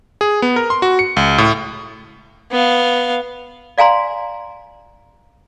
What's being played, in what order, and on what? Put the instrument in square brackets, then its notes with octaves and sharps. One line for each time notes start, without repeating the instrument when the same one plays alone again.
[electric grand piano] G#4
B3
A#4
C6
F#4
C#7
C#2
A2
[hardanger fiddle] B3 F5
[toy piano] D5 F5 G#5 A#5 C6